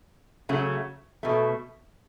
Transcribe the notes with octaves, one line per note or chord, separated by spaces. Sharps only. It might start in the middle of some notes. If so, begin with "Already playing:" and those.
C#3 F#3 A3
B2 A3